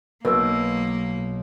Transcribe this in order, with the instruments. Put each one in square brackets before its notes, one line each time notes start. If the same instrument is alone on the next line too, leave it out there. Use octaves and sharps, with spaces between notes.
[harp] B1 [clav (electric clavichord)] B2 [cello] A#3 [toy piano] A#4 B4 E6